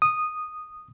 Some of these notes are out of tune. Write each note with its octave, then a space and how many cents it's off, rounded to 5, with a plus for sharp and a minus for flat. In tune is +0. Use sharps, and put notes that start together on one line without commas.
D#6 -10